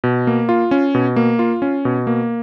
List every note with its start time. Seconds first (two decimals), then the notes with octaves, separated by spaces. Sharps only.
0.04 B2
0.27 A#3
0.49 F4
0.71 C#4
0.95 B2
1.16 A#3
1.39 F4
1.62 C#4
1.85 B2
2.07 A#3